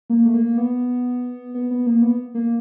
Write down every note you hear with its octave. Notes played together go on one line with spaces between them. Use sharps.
A#3
A3
A#3
B3
B3
B3
A#3
B3
A#3